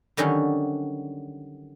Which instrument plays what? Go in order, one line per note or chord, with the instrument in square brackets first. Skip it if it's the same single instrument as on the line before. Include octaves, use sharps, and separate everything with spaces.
[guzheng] D3 D#3 F#3 G3 C#4